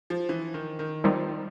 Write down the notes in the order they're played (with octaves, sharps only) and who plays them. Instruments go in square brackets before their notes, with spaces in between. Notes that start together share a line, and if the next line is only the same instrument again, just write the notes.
[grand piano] F3
E3
D#3
D#3
[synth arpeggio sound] D#3 G3 C4 D#4 [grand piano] F3